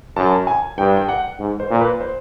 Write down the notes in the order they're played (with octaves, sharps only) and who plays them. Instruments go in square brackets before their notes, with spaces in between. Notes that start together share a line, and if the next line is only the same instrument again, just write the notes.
[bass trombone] F#2 [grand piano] A5
[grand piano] G#5
[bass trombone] G2 [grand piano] G5
[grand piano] G5
F#5
[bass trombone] G#2
[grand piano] C5
[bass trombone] A#2
[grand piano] B4
C5